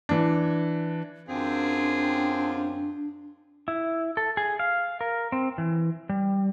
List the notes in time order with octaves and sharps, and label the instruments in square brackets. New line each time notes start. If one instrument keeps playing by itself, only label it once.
[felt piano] E3 D4
[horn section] F#2 C4 [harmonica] D3 F4 G#4 [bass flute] D4
[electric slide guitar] E4
A4
G#4
F5
A#4
C4
E3
G3